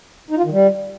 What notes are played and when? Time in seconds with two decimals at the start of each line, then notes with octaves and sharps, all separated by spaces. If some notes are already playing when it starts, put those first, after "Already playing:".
0.30 D#4
0.38 F4
0.45 D#3
0.52 G3